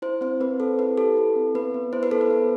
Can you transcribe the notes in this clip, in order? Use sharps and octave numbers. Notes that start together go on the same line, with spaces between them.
E4 C5
C4 C5
C4 B4
C4 A4
E4 B4
G4 A4
E4
C4
B3 B4
B3
E4 C5
B4
B3 A4
B4
B3